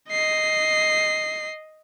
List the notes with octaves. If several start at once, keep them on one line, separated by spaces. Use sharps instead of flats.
D#5 C7